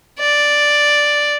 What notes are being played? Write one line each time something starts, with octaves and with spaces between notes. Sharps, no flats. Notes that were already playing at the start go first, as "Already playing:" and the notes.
D5